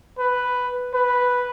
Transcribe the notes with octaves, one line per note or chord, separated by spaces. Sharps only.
B4
B4